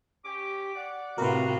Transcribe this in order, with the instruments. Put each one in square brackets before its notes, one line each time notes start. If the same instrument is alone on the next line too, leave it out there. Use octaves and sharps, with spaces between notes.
[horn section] C#4 G4 [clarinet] D6
[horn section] D5 F#5
[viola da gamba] A2 C3 F4 [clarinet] F#4 [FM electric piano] A#4 B4